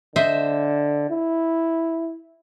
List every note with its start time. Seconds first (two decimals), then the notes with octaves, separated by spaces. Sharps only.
0.16 D3 C5 D#5 E5
1.10 E4